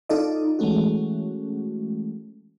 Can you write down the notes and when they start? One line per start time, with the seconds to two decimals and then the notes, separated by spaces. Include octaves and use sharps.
0.09 D#4 F4 A4 D5 D#5
0.59 E3 G#3 A3 C#4 F#4